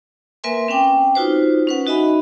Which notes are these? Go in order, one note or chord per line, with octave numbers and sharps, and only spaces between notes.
A#3 A#4 B4 E5 G#5 C6
C4 C#4 G5 D6
D#4 F4 F#4 B4 C5
C#4 B4 F#5
D#4 F#4 D#5 E5 G#5 B5